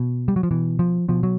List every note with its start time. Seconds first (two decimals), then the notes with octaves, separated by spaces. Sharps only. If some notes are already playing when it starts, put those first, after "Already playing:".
Already playing: B2
0.28 G3
0.36 F#3
0.43 F3
0.51 B2 E3
0.79 F3
1.08 B2 F3
1.23 F#3